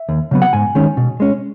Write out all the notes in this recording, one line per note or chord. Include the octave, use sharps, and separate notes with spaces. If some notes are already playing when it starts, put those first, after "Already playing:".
Already playing: E5
D#2
C#3 F#3 B3
F#5
G#2 G#5
D#3 G#3 C#4
B2
G#3 C#4